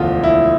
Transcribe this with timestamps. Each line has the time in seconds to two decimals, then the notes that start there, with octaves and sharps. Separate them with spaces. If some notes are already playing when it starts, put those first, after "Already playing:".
Already playing: E1 D2 D3 F3 F4
0.23 E4